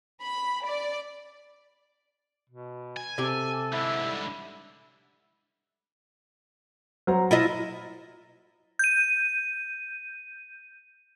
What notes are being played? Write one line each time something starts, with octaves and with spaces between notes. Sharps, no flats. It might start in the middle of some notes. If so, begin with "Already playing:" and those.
B5
D5
B2
G#5
C3 G4 A4
G#2 D3 E4
G3
F#3 C5 A#5
E4 F4 D#5
G6 D#7